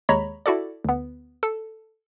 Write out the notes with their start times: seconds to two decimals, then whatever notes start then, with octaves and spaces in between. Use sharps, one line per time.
0.09 D#2 G#3 C#5 A#5 B5
0.46 E4 F#4 A4 D5
0.85 D2 B3
1.43 A4